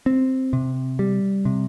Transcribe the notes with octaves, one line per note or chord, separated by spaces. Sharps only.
C4
C3
G3
C3